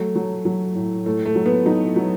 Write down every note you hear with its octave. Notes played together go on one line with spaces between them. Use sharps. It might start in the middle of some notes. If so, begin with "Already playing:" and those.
Already playing: F#3 A3
F#3
F#3
A2
A2 A3
A3
F#3
B3
F#3 D#4
F#3